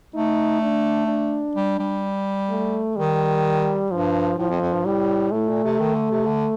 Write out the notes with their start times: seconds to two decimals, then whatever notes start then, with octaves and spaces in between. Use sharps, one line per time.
0.15 A3 D#4
0.62 D4
1.08 D4
1.55 G3
1.79 G3
2.50 A3
2.96 D#3 G3
3.90 G2 F3
4.38 A2 F3
4.50 F2
4.61 F2
4.73 G2
4.85 A2 G3
5.32 A2 A3
5.49 A#2
5.64 C3
5.79 D#3
5.95 D3
6.11 C3
6.26 D3